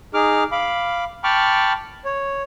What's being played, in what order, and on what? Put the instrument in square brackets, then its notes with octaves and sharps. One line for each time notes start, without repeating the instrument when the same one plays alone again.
[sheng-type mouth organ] D#4 G#4 D6 F6
F5 B5 D6
G5 A5 B5 C#6 D6 F6
C#5